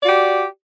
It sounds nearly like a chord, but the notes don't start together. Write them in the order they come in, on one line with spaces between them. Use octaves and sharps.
D5 F#4 G4